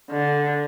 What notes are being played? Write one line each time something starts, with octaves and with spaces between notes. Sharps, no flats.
D3